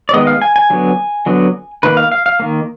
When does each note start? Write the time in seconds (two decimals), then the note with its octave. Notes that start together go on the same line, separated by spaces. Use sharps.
0.09 D5
0.13 D#3 G#3 B3 D#5
0.27 F5
0.42 G#5
0.56 G#5
0.70 D3 F#3 B3
1.26 D3 F#3 B3
1.83 D#3 A#3 B4
1.97 F5
2.12 F5
2.26 F5
2.40 D#3 A#3